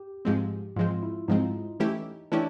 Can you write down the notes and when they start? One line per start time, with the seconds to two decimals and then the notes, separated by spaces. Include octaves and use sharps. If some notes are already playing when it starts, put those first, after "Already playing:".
Already playing: G4
0.25 G#2 F3 G#3 C4
0.76 G#2 F3 G#3 C4 F4
1.03 E4
1.28 G#2 F3 G#3 C4 D#4
1.80 E3 A3 C#4 E4 G4
2.32 E3 A3 C#4 D4 E4 G4